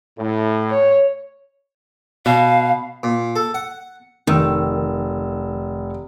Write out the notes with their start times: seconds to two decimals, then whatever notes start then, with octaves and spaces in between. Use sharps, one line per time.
0.19 A2
0.70 C#5
2.26 B2 F5
3.03 A#2
3.36 A4
3.54 F#5
4.27 F1 D#3 E6